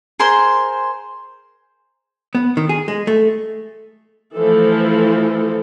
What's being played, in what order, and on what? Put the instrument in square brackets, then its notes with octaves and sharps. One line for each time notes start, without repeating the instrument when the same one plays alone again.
[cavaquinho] G#4 A#4 C5 C6
[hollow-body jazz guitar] B3
D#3
G#4
G#3
A3
[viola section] E3 F3 A3 A4